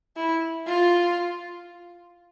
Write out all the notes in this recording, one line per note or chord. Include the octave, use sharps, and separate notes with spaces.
E4
F4